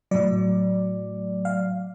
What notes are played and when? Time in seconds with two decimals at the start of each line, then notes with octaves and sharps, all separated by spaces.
0.11 A2 F#3 D5
1.45 F5